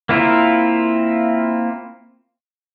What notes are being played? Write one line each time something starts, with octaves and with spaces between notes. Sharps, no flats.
A#3 C4 E4 F4 A#4